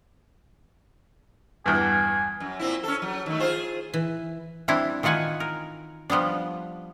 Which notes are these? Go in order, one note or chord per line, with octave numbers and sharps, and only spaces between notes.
E2 G2 G#5
F#2
A#2 C4 E4
C#4 A4
F#3
D#3 A3
F4 G#4 C5
E3
E3 G3 C4 D4 E4
D#3 E3 F4 F#5 G#5
A#4
F3 G3 B3 D4